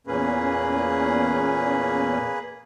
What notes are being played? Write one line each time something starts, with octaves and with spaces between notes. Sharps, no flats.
E2 A#2 A#3 C#4 G#4 B4